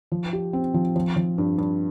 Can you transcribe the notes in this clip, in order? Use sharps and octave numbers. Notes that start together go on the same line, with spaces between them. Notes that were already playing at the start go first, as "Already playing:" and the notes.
F3
G4
C4
F3
F3
F3
G2
G2